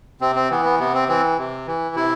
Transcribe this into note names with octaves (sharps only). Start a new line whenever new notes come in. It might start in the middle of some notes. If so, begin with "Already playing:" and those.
C3 C4
C4
E3 B3
B3
C3 B3
C4
E3 C4
C3
E3
C3 E4